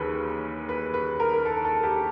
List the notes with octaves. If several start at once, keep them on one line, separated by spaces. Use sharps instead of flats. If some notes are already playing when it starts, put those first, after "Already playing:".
Already playing: D#2 C#3 E3 B4
B4
B4
A#4
A#4
A4
A4
G4